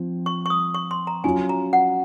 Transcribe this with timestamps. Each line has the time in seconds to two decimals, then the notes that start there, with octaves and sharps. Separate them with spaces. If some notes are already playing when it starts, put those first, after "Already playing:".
Already playing: F3 C4
0.26 C#6
0.46 C#6
0.50 D#6
0.74 C#6
0.91 C6
1.07 A#5
1.24 F#3 C#4 F4 G#5
1.49 A#5
1.73 F#5